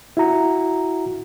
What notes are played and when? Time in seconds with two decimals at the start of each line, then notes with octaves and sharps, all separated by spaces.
0.17 E4 F#4 A#5